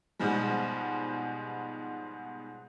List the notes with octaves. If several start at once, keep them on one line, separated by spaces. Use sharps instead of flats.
G#2 B2 F3 G3 G#3